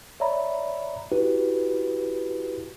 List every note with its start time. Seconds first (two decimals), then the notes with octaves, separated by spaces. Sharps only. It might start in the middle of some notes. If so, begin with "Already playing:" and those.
0.20 C#5 D5 E5 A#5 B5
1.12 E4 F#4 G4 B4